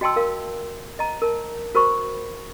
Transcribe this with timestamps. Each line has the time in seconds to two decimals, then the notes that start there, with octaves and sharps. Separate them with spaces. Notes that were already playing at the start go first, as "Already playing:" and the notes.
0.01 F#4 D#5 G5 A5 C6 E6
0.16 A#4 F5
0.99 D#5 A#5
1.22 A#4 A5
1.75 F#4 A#4 C5 B5 C#6